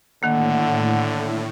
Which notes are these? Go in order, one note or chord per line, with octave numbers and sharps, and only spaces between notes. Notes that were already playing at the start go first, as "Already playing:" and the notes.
A2 D3 D#3 A#3 F#5